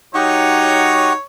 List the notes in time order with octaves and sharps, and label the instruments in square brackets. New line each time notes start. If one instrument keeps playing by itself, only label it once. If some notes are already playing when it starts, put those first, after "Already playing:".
[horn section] F#3 D#4 [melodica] G4 F#5 C#6 [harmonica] C#5